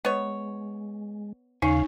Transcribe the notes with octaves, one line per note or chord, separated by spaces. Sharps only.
G#3 B3 C#5
D#2 C#3 C#4 D#4 F5